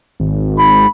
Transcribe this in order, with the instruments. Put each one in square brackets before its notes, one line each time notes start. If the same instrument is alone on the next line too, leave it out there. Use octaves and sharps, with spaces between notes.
[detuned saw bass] G#1
[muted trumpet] B5